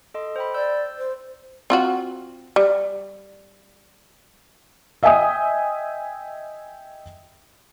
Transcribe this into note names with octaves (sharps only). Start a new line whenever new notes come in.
A4 D#5 C6
C5 G5 B5
D5 E6 G6
C5
C4 F4 F#4
G3
D#5 E5 G5 G#5 D#6